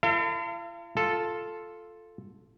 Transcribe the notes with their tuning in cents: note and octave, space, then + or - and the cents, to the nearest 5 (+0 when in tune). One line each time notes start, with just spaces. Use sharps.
E4 +45 A4 +45 F5 -35
F4 +0 A4 +0